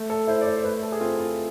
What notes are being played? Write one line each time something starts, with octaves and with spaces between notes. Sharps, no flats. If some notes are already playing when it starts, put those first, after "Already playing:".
Already playing: A3
A4
E4 C5
D5
C5
C5
A3 B4
A4
G#4
C4 F4
F4